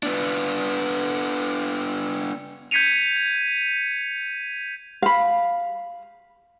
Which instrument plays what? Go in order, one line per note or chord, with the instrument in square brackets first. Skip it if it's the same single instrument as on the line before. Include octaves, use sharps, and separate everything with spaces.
[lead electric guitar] B3 D4
[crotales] G6 G#6 B6 C#7 D#7 F7
[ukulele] F5 B5